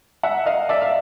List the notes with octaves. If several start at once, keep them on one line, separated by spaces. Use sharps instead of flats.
E5 F#5
D#5 F5
D5 E5
F5